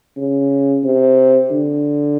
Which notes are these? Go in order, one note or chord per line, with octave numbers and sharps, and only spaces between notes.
C#3
C3
D3